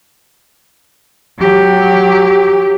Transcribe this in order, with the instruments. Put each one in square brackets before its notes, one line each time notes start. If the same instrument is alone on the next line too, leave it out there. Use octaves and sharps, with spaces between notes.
[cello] F#3 G4